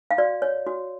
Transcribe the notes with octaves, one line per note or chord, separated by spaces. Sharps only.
F5
F#4 D5
C#5
F#4